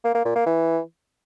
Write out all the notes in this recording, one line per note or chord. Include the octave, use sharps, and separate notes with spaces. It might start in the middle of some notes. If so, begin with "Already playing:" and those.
A#3
A#3
A#2
A#3
E3